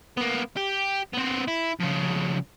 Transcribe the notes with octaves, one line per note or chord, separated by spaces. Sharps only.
A#3 B3
G4
B3 C4
E4
F2 C#3